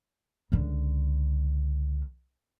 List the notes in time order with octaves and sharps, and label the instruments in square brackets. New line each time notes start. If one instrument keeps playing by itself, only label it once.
[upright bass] C#2 D3